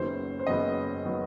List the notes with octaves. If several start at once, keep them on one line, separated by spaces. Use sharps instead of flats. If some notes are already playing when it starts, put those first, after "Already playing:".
Already playing: F#1 F#2 D#3 F#3 B3 C5
C5
F#1 F#2 D#3 F#3 B3 D#5
D#3 F#3 B3